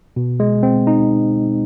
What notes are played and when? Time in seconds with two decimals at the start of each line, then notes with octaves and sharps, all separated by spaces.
0.16 B2
0.40 G#3
0.63 C4
0.87 D#4